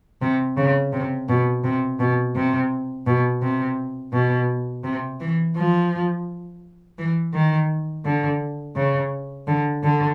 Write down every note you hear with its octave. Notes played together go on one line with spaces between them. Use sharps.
C3
C#3
C3
B2
C3
B2
C3
B2
C3
B2
C3
E3
F3
E3
D#3
D3
C#3
D3
D3